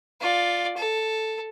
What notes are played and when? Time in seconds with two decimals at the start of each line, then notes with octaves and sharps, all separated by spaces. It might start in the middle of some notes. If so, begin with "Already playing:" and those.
0.21 F4 D5
0.77 A4